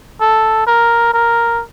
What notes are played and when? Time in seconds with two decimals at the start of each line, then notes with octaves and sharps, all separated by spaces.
0.21 A4
0.67 A#4
1.14 A#4